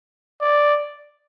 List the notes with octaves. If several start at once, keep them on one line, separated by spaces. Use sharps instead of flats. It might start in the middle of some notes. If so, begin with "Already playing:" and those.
D5